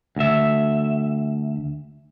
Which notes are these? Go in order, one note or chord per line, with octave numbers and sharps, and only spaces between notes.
D2 E5